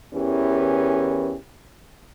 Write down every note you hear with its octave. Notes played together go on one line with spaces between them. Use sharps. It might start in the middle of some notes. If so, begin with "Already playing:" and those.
E2 E3 C#4 G4 A#4